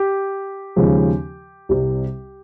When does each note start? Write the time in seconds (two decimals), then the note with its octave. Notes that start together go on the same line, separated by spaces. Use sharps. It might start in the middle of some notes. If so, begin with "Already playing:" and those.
Already playing: G4
0.76 D#2 C#3 F3 G#3
1.69 C2 C3 G3